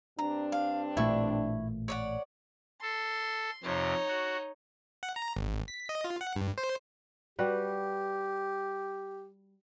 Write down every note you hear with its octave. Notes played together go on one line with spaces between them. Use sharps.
G2 C4 D4 A#5
F5
A1 A#2 A3 E4 C#6
C#5 D5 F#5
A4 C6
F2 C3 D#4 C#5
F#4
F#5
A#5
G#1
B6
D#5
F4
F#5
G2
C5
G3 F#4 G4 B4